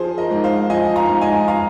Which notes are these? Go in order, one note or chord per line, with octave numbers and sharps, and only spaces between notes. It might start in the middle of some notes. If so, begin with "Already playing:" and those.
Already playing: F3 G#4 C5
A#4 D#5
G#2
C5 F5
F3 D#5 G#5
F5 A#5
G#2
D#5 G#5
F5 A#5